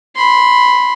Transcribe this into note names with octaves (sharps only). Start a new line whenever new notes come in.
B5 C6